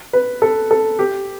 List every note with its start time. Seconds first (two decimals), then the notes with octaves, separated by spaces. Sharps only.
0.13 B4
0.42 A4
0.71 A4
0.99 G4